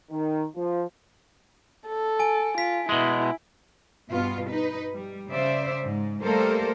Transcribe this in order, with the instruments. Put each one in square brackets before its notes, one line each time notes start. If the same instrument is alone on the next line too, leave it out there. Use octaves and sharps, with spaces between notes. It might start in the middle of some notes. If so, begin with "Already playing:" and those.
[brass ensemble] D#3
F3
[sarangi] A4
[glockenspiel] G#5 D7
[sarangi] F4 [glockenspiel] B6 D7
[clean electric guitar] B2 G#3 [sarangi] E4
[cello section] G2 B2 B3 F4
D#4 B4
G3
C#3 C5 D5 E5
G#2
G3 A3 A#3 A4 A#4 C5